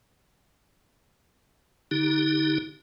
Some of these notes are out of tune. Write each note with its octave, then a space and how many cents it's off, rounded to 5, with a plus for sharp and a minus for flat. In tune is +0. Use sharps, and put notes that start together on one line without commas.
D3 +0 D#4 +30 G4 +0